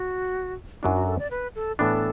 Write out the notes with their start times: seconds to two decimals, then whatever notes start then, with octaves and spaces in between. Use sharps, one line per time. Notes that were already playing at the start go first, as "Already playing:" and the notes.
Already playing: F#4
0.82 F#2 F#3 D4 E4
0.95 F#4
1.07 A4
1.19 D5
1.31 B4
1.56 A4
1.79 A2 E3 B3 D4 A4